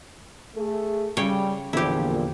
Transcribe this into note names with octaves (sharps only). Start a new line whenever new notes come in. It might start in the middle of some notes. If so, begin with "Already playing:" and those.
A3 G#4
C#3 G3 C#5 G5
E2 A#2 D3 F3 E4 G4